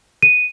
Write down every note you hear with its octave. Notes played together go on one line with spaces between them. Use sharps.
D#7